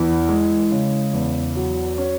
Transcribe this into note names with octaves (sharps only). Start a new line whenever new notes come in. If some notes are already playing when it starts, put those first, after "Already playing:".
Already playing: E2 E3
G#3
C#3
E2
F#3
C#4